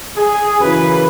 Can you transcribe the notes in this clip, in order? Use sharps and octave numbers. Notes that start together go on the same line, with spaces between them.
G#4
F#2 C#3 E3 B4